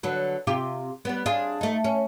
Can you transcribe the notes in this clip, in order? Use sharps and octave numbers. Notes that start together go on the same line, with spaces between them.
D3 F#3 B4
C3 F4 G4
G3 B3
D4 F4 G#4
A3 D#4
C#4